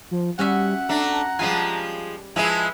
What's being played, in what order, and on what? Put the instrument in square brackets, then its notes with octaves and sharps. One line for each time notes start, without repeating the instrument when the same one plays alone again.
[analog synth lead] F3
[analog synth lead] G3 [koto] C#4 F#4 E5 [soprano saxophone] F#5
[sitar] A3 D4 [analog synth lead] A#5
[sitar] F3 G#3 F4 [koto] G3 B4 G#5
[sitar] F3 G#3 E4 [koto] G#4 B4 E5 [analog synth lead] G#5